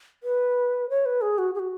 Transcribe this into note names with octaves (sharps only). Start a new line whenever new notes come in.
B4
C#5
B4
G#4
F#4
G#4
F#4